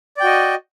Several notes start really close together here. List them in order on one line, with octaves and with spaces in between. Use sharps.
D5 G5 F#4 D#5